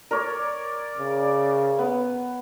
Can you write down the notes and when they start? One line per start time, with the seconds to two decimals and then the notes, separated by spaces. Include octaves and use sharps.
0.11 A#4 C#5 D5
0.98 C#3
1.79 B3